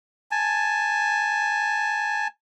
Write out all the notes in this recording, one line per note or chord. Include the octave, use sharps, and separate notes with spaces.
G#5 A5